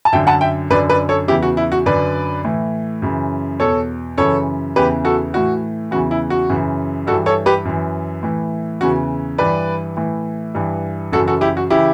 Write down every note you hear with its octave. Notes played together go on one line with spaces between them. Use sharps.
A5
F#2 D3 E5 G5
F#5 A5
E5 G5
F#2 D3 B4 D5
B4 D5
A4 C#5
E2 C#3 E3 E4 G4
F#4
E4
F#4
F#2 D3 B4 D5
A2 E3
F#2 C#3 E3
E2 B2 A4 C#5
F#2 C#3 E3 A4 C#5
E2 C#3 E3 G4 B4
F#4 A4
A2 E3 F#4
E2 C#3 E3 F#4
E4
F#4
F#2 C#3 E3
G2 F#4 A4
E3
A4 C#5
G4 B4
F#2 E3
A2 E3
E2 C#3 E3 F#4
G2 E3 B4 D5
A2 E3
G2 E3
F#2 C#3 E3 F#4 A4
F#4 A4
E4 G4
F#4
C#3 E3 E4 G4